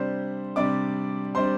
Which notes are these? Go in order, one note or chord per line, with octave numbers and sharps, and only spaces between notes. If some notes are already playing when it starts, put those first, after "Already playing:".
Already playing: C3 G3 D4 C5 C6
C3 G3 D4 D5 D6
C3 G3 D4 C5 C6